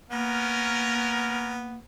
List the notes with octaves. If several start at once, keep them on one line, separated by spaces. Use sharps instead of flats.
A#3 B3 C#4 A#4